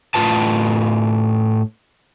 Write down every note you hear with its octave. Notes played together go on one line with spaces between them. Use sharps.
A2 F4 B4 A5